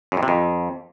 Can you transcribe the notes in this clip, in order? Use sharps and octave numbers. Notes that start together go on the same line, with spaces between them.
F#2
F2
C3
F2